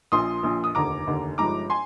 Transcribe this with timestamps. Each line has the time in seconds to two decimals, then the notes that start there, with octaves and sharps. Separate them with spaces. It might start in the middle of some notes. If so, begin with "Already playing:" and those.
0.12 A#1 A#2 F3 C6 D#6
0.43 A#1 A#2 F3
0.64 D#6
0.75 F1 D#2 D3 A#5 D6
1.07 F1 D#2 D3
1.38 G1 G2 F3 G#3 D#4 A#5 D6
1.70 G#5 C6